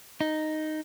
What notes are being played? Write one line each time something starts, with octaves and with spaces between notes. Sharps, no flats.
D#4